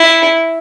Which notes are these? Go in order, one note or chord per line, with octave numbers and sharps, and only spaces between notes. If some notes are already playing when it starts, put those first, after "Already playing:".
Already playing: E4